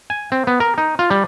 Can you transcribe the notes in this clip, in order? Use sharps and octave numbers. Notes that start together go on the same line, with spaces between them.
G#5
C4
B3
A#4
D#4
F4
G3